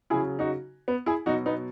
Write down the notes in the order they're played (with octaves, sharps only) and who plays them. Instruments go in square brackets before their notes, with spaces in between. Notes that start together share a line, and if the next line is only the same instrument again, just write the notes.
[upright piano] C#3 F#3 E4 G#4
D#4 F#4
B3
E4 G#4
B2 F#3 D#4 F#4
B3 D#4